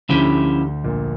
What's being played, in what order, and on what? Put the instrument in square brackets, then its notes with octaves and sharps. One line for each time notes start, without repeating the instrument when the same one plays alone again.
[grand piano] D2 D3 [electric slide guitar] F3 C#4 E4 G4
[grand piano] A#1 A#2